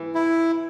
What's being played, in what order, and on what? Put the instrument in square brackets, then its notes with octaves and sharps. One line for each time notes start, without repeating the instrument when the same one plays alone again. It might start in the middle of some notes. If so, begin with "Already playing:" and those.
Already playing: [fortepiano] E3
[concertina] E4